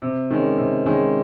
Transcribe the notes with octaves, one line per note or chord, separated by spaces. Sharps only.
C3
D#3 G#3 C#4
C3
D#3 G#3 C#4